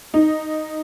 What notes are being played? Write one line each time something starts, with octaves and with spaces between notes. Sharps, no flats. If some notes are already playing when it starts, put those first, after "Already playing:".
D#4